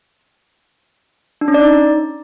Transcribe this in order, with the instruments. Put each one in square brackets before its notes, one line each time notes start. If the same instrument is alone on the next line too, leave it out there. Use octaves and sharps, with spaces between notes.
[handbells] D4
C#4
D5
D#4